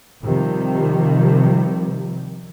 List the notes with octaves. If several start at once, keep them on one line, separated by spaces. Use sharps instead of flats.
C3 D#3 F3 G3